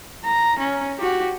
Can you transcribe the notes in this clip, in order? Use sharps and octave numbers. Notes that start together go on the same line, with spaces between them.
A#5
C#4
F#4 G4